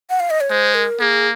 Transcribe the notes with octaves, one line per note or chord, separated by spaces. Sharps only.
F#5
F5
D#5
C#5
G#3 C5
A#4
A#3 G#4